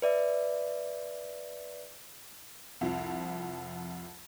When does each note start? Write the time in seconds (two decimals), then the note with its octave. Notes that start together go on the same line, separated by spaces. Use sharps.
0.02 B4 D5 E5
2.81 C2 F2 F3